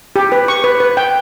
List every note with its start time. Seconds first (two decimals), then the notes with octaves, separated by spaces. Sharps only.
0.16 G4
0.32 B4
0.48 C#6
0.64 B4
0.80 B4
0.97 G5